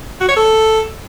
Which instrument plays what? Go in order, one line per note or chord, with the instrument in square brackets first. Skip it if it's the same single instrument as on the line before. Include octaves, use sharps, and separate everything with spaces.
[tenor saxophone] F#4
C#5
A4